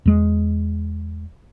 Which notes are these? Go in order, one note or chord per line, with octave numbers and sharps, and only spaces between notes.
E2 G#3